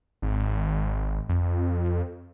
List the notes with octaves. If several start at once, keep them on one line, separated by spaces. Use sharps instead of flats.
G#1
F2